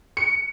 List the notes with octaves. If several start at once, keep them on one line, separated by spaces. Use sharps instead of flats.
C#7